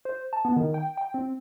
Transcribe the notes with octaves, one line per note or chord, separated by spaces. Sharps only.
C5
A5
B3
D#3
G5
G5
C4